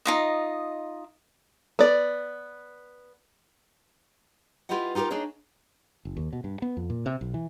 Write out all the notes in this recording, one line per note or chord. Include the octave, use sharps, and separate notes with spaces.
D#4 F4 D#5
B3 D5
E4 F4 G4 B4 D#5 F#5
D#4 F4 G4 G#4 A#4
D4 D#4 G#4 C#5 D#5
F#1
D#2
B2
G2
B3
F2
A#2
C3
B1
E3